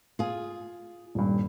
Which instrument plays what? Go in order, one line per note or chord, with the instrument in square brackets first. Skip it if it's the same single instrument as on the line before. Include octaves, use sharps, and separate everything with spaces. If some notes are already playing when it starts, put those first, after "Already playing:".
[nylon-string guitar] F4 G#4
[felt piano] D#1 G2